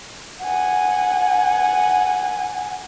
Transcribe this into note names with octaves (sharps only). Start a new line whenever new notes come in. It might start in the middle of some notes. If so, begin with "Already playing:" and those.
F#5 G#5